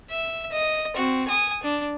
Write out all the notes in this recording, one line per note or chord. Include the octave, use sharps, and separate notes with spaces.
E5
D#5
C4 F#4
G#5 D#6
D4